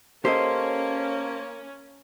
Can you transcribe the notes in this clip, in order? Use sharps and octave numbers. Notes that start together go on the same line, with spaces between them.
A#3 C#4 G4 A4 C5 D#5